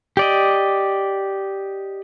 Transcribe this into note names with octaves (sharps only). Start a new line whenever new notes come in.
G4 D5 D#5